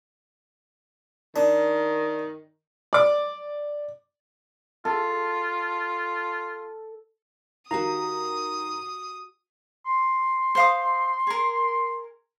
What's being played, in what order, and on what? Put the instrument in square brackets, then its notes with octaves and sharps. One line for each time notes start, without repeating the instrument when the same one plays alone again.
[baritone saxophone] D#3 [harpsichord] D4
[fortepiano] D5 D6
[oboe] F4 [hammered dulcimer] A4
[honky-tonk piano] D#3 [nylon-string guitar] F#4 G4 F5 [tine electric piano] A#5 [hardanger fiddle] D#6
[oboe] C6
[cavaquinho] C5 F5 D#6
G#4 A#4